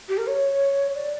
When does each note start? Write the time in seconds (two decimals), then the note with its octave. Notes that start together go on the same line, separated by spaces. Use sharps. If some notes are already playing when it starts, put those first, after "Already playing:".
0.09 G4
0.18 A#4
0.27 C#5
0.94 D5